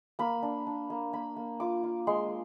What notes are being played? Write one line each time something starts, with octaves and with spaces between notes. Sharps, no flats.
A#3 B5
D4
D4
A#3
A#3 B5
A#3
F4 D6
F4
G#3 C6